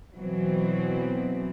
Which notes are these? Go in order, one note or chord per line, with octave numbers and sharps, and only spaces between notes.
B2 E3 F#3 C4